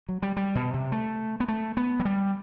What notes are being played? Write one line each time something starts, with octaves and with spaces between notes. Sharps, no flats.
F#3
G3
G3
B2
C3
A3
B3
A3
B3
F#3
G3